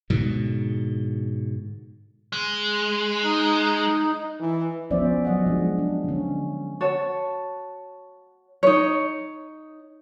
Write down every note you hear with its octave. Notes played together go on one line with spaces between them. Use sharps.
G#2 B2 D3
G#3
D#4
E3
F3 B3 C#4 C5 D5 E5
F#3 D#5 F#5
F3 G#3 D4
D4
D3 C#4
F#4 C#5 A5
D#4 C#5